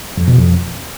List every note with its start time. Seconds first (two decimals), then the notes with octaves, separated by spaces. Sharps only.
0.17 F2
0.28 B2
0.38 F2